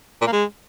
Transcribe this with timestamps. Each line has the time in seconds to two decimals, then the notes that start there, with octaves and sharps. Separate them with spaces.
0.21 A#2
0.27 A#3
0.33 G#3